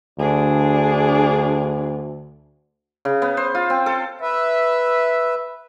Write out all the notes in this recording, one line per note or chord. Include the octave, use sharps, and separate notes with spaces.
D2 D4 G#4
C#3
B3
C5
F4
C4
A4
B4 E5